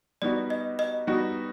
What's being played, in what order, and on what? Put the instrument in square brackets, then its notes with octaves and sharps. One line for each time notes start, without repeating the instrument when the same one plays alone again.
[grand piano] G3 B3 D#4 F#4 [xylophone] D5
[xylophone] D#5
D#5
[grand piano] G3 B3 D#4 F#4